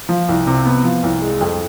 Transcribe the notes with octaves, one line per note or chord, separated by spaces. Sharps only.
F3
C2
C3
B3
F3
C2
G#3
F2